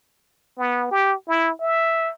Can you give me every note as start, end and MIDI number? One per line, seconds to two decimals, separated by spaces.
0.58 0.87 59
0.91 1.14 67
1.28 1.52 64
1.60 2.11 76